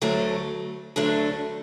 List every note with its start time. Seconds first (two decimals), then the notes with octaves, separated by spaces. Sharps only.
0.02 D2 D3 F#3 A3 D4
0.96 D2 D3 F#3 A3 D4